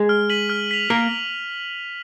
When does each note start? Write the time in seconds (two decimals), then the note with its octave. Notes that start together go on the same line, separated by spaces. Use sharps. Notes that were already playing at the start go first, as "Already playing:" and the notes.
Already playing: G#3 G#4
0.09 F6
0.30 B6 D#7 F#7
0.50 F6
0.71 B6 F7
0.90 A#3 A#4 F6